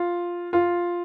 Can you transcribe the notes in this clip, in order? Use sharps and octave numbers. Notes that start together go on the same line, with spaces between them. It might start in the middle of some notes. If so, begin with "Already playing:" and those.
Already playing: F4
F4